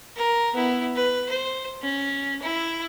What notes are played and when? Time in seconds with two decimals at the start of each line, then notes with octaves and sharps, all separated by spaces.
0.16 A#4
0.53 B3 E4
0.96 B4
1.29 C5
1.82 C#4
2.42 E4